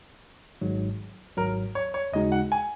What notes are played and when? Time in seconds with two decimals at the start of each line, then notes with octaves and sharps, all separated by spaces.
0.61 G#1 G#2 F#3
1.37 G#1 G#2 F#3 A#4
1.75 C#5
1.94 C#5
2.13 D#2 C#3 G#3 D#4 F#4 D#5
2.32 F#5
2.52 G#5